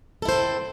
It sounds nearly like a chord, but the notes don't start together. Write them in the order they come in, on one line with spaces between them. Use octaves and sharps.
A4 E4 C5 C4